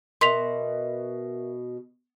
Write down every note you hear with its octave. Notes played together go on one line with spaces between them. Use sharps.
B2 A#4 E5 C6 B6 F7